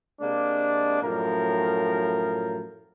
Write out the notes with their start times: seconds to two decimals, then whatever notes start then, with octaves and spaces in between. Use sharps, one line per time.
0.21 C3 G#3 A#3 D4
1.03 F#2 A2 F3 A#4